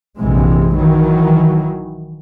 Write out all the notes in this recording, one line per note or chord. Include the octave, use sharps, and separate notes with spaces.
A#1 F#2 C3 E3 G#3
D#3 E3 F#3